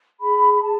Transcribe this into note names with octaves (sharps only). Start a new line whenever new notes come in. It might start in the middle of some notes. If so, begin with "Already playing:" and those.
G#4 B5
B5
G#4 A5